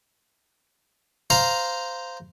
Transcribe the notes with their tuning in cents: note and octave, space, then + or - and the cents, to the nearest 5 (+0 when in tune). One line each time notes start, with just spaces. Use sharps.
C5 -10 F5 +0 A#5 +0